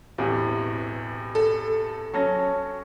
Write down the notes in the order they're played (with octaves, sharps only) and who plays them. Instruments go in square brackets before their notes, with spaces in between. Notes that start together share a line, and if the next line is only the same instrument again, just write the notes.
[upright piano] E1 E2 A2 [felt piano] C4 G4
[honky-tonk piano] A4
[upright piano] F#3 C#4 A#6 [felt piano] A5